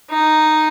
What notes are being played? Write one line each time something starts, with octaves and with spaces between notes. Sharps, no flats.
D#4